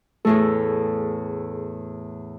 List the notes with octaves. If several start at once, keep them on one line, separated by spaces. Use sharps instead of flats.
E2 A2 A3 G#4 A4